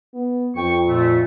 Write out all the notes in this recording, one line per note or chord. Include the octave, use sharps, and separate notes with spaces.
B3
F2 G5 C#6
A#2 A3